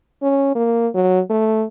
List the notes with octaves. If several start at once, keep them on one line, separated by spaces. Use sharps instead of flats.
C#4
A#3
F#3
A3